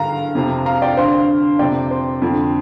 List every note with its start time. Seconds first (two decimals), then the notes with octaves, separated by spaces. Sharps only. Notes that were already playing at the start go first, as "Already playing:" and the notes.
Already playing: G2 D3 F5 A#5
0.35 F2 C3
0.66 F5 A#5
0.82 D5 G5
0.97 G2 D3 C5 F5
1.59 F2 C3 D5 G5
1.91 C5
2.22 F2 D3